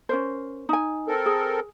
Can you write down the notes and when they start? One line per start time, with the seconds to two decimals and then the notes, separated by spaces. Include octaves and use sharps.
0.09 C#4 A#4 C5
0.69 D#4 G#5
1.08 C4 A4 A#4
1.26 G#4